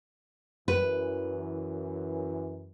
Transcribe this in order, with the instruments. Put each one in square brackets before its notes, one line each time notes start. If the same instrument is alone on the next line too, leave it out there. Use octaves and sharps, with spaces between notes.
[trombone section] F#2 E3 [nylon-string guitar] B4